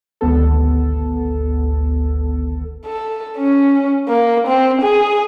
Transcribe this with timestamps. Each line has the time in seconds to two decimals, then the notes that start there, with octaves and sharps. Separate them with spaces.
0.21 G#1 D2 B3 A4
2.86 A4
3.38 C#4
4.09 A#3
4.48 C4
4.82 G#4